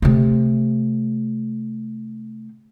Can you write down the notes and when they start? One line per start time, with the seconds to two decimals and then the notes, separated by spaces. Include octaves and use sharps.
0.02 C3 A3